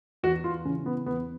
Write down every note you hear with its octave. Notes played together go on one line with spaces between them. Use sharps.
E2 F#4
F4
C#3 E3 C#4
B3
E2 B3